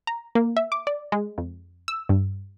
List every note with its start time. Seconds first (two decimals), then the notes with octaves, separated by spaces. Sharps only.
0.07 A#5
0.35 A#3
0.57 E5
0.72 D6
0.87 D5
1.12 G#3
1.38 F2
1.88 E6
2.09 G2